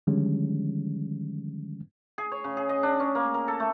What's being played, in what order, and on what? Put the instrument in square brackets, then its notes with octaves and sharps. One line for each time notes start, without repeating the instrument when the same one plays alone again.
[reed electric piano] D3 D#3 F3 G3 G#3 C#4
[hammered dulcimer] G#4
C#5
C#3
G#4
D#5
D4
C#4
A#3
A#4
A4
A3